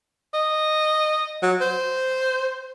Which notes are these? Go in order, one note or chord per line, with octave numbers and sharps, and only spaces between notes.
D#5
F#3
C5